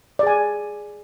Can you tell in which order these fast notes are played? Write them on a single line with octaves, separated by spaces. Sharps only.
D5 G#4 G#5